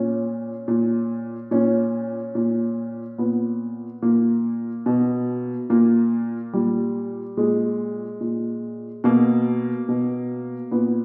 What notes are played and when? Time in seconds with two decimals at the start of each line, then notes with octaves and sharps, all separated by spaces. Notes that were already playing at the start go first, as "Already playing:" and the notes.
Already playing: A#2 C#4
0.68 A#2
1.51 A#2 C#4
2.35 A#2
3.18 A#2 B3
4.02 A#2 A#3
4.86 B2
5.70 A#2 A#3
6.53 A#2 G3
7.37 A#2 G#3
8.21 A#2
9.04 B2 A#3
9.88 B2
10.71 A#2 B3